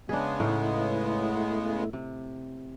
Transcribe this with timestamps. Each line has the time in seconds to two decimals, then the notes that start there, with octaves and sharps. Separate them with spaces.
0.09 C#3 G#3 B3 D4 G#4
0.40 A2 A3 D#4 E4 F5
1.93 C3